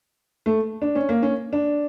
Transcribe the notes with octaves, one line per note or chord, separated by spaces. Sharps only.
A3
D4
C#4
A#3
C#4
D4